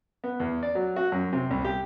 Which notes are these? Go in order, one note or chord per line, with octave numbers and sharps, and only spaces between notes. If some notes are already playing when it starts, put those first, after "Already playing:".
B3
E2
D5
F#3
F#4
F#2
C3
C2
G4